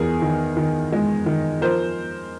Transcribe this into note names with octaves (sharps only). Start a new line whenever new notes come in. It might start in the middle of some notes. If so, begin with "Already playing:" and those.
Already playing: E2 G#4 A#4
D#3
D#3
G#3
D#3
F3 A#4 C5